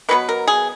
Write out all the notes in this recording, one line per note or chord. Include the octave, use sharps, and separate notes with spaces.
B2 F#3 B3 B4
A#4
G#4